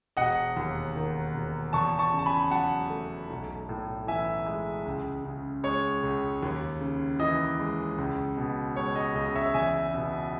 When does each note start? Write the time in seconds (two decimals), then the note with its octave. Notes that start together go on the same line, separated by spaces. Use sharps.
0.17 E1 D#5 F#5
0.57 D#2
0.95 D#3
1.34 E1
1.73 E2 A5 C#6
1.99 A5 C#6
2.12 C#3
2.19 A5
2.26 G#5 B5
2.51 F#3 F#5 A5
2.90 A3
3.30 B1
3.69 A2
4.07 E3 E5 G#5
4.46 G#3
4.86 C#2
5.25 C#3
5.64 G#3 C#5
6.03 C#2
6.43 D#2
6.81 C#3
7.20 E3 D#5
7.59 G#3
7.98 C#2
8.37 B2
8.76 G#3 C#5
8.96 D#5
9.15 C#2 D#5
9.35 C#5 E5
9.54 E2 E5 G#5
9.94 B2